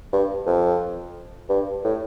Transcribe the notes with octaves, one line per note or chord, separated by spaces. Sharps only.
G2
F2
G2
A2